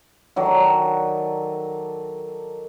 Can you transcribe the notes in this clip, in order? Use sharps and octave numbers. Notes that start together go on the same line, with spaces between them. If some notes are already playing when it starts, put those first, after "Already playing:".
D#3 F#3 A4 D5